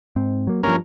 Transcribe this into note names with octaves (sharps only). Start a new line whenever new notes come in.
G#2 C4
F#3 A#3
G2 F3 A#3 C#4 A#4